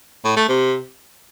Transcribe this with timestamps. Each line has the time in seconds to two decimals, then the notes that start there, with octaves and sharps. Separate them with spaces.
0.24 A2
0.36 A3
0.48 C3